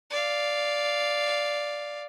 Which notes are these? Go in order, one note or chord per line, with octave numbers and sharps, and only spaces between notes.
D5 F5